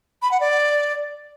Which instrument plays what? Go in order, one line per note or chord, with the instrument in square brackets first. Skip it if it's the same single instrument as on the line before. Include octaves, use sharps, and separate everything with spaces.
[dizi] B5
F#5
D5